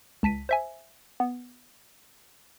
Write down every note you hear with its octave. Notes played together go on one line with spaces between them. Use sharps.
C#2 A5 B6 D#7
C5 E5 G#5
B3